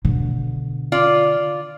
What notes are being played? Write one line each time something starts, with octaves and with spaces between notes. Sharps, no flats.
B2 D3
F4 D5